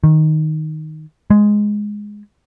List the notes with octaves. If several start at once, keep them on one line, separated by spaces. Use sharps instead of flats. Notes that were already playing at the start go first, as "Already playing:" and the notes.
D#3
G#3